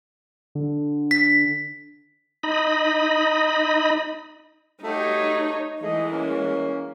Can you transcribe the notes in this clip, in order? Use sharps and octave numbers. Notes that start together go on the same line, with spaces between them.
D3
B6
D#4 D#5 B5
A3 D#4 F#4 G4 C#5
E3 G#3 A3 G#4 D#5
A#3 C#4